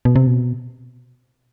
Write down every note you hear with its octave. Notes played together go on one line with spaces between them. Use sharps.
B2
C3
B2